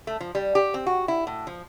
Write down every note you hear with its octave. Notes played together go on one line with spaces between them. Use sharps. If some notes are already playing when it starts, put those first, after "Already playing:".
A3
F3
G3
G4
C4
F#4
E4
A2
F3